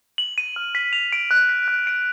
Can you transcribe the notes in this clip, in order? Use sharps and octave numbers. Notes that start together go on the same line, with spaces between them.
F#7
D#7
F6
B6
F7
D7
F#6
B6
F#6
D7